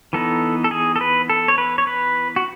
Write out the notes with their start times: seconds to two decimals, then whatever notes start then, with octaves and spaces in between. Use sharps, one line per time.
0.13 E3 B3 D#4 A4
0.64 A4
0.71 G#4
0.96 A4
1.01 B4
1.30 A4
1.48 C#5
1.58 B4
1.78 C#5
1.87 B4
2.36 F#4